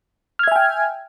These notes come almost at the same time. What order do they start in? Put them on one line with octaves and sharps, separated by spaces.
F6 G#6 E5 G#5 G5